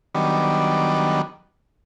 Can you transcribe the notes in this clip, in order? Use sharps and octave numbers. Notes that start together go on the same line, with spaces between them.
D#3 F#3 G3 B3 D4